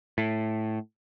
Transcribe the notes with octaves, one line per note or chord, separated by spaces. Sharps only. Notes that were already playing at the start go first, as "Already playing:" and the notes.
A2